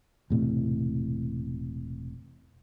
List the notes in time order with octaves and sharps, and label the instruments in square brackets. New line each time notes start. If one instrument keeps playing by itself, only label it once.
[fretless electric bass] E1 A2 C3